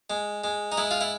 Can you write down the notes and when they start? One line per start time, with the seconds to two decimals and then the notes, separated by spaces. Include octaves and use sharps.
0.10 G#3
0.44 G#3
0.72 D#4
0.77 G#3 E4
0.91 F4
1.01 E4